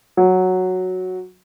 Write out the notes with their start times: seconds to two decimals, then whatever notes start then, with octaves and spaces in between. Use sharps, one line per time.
0.17 F#3